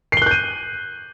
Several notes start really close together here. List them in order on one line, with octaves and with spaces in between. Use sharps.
C7 G7 F#6 G6 D#7